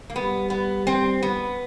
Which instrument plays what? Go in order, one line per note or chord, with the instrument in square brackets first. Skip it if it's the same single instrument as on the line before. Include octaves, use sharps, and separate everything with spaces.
[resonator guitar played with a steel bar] A#3
[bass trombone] G3 [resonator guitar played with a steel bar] B3
[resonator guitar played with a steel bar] B3
C4
B3